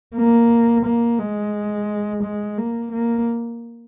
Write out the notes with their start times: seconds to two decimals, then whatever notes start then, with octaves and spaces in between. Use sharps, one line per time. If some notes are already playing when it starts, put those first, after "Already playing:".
0.16 A#3
0.86 A#3
1.19 G#3
2.23 G#3
2.58 A#3
2.92 A#3